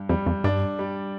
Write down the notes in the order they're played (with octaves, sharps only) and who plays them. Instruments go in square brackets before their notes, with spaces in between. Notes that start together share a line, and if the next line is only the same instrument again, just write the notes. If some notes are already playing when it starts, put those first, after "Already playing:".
Already playing: [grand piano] G2
[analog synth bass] F2 [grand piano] G3
[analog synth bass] F2
[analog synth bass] G2 [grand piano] D4
[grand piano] G3